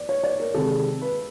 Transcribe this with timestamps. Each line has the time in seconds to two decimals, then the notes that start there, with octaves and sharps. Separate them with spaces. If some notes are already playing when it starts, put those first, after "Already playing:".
Already playing: D5
0.09 C#5
0.23 D5
0.40 A#4
0.54 C3 D#3 G#3 A4
1.02 B4